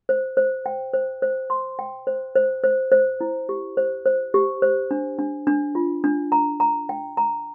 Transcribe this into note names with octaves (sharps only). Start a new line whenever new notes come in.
C5
C5
G5
C5
C5
C6
G5
C5
C5
C5
C5
E4
G4
C5
C5
G4
C5
D4
D4
D4
F4
D4
A#5
A#5
G5
A#5